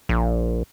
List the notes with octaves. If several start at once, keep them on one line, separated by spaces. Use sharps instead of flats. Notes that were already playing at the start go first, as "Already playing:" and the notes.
A#1